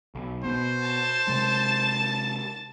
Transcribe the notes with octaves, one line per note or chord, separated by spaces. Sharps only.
B1
B2 B3 C5
A5 A6
C3 G#3